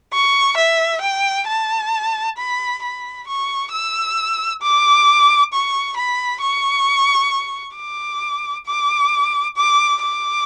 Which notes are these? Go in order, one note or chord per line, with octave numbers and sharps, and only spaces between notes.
C#6
E5
G5
A5
B5
B5
C#6
E6
D6
C#6
B5
C#6
D6
D6
D6
D6